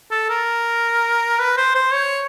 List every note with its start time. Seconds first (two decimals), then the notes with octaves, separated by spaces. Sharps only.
0.11 A4
0.30 A#4
1.39 B4
1.57 C5
1.75 C5
1.93 C#5